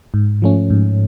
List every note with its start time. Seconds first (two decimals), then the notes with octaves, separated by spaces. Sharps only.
0.14 G#2
0.42 F3 A3 C#4
0.70 G#2